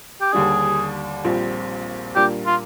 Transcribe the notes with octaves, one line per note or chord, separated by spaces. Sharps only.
G4
D#2 D3 G3 D4 G#4
A#1 A#2 G3 C4
A#2 G3 A#3 D4 G4
F4